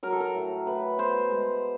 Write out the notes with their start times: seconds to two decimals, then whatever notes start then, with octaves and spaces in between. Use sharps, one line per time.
0.03 F#3 A#4
0.12 A4
0.20 A#4
0.35 A2
0.66 A2 B4
0.98 B3 C5
1.30 G#3